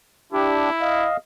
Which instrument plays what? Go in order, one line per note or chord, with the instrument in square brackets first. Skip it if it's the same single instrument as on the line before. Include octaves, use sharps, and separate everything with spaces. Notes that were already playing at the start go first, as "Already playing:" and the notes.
[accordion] D4 G4 [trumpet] E4
[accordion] D#5 F5